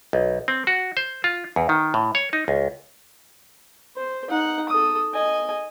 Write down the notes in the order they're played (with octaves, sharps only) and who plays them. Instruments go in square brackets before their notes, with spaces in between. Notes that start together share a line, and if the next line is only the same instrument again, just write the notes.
[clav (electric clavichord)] B1
C4
F#4
C5
F4
E2
D#3
A2
C#5
D#4
C#2
[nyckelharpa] C5
D#4 F#5
A4 D#6
D#5 G#5